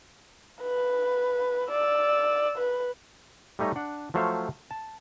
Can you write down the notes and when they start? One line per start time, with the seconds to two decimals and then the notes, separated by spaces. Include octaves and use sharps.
0.63 B4
1.71 D5 E6
2.58 B4
3.59 G3 A3 D#4 C#5 D#5
3.76 D4 F#5
4.14 F3 F#3 A3 C5 C#5 F5
4.71 A5